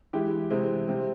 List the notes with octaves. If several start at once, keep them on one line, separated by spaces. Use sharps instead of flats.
E3 G#3 E4 G4
C3 E3 G#3 C4
C3 G3 C4